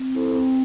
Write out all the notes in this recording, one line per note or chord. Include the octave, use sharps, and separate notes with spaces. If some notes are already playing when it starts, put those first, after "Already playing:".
Already playing: C4
E4 A4 C5
C4